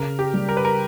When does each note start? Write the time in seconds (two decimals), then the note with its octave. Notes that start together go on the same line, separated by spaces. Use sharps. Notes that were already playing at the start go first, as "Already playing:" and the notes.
Already playing: C#3 A#4
0.19 G4
0.34 G3
0.49 A#4
0.57 B4
0.65 A#4